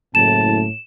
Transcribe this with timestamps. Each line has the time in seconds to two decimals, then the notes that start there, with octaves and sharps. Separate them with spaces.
0.15 F#1 A2 A5 E7